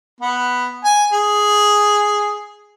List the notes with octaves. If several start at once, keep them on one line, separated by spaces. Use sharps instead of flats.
B3
G#5
G#4